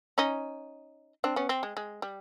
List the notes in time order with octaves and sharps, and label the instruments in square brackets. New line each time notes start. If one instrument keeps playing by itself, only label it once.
[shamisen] C#4 D#4
C4 D4
B3 C#4
C4
G#3
G#3
G3